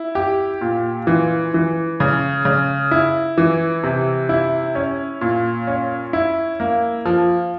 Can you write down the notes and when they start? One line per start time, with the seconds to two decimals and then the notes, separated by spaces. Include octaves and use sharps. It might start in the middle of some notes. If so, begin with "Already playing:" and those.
Already playing: E4
0.15 G4
0.61 A#2
1.07 E3
1.54 E3
2.00 C#3
2.45 C#3
2.91 E4
3.38 E3
3.84 C3
4.29 E4
4.75 C#4
5.21 A#2
5.67 C#4
6.13 E4
6.60 A#3
7.06 F3